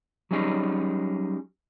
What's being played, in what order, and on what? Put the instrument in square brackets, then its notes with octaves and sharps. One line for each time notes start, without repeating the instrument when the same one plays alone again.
[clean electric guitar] F#3 G3 C#4 D#4 G#4